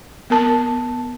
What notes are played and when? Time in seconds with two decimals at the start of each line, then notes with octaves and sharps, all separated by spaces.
0.30 B3 A#4 A5